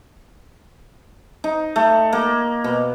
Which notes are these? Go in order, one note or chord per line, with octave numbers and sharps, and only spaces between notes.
D#4
A3
A#3
B2